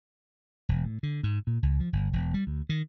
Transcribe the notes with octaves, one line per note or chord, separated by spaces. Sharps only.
E1
A2
D3
G#2
A#2
C#2
F3
G1
E1
G3
D2
D#3